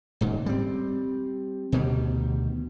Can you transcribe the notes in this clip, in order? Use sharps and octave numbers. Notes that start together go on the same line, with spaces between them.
D#1 G#2 C#3
G3 C4
D2 B2 D#3 G3